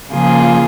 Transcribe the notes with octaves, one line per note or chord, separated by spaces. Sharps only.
C#3 F3 A#3 F4 G#4